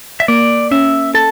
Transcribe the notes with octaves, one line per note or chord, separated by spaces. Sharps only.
E5
A#3 D5
C#4 E5
A4 A5